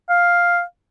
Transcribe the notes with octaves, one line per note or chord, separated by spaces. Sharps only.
F5